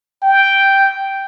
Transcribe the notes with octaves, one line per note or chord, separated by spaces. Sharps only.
G5